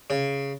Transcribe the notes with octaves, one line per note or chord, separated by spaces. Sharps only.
C#3